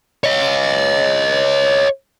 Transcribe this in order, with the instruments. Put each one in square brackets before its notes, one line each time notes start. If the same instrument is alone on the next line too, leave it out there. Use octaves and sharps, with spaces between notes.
[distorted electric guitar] C#5 D#5